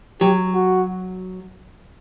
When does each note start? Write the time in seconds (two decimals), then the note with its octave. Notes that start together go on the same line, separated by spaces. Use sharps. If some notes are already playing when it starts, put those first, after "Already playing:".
0.21 F#3 G4
0.55 F#4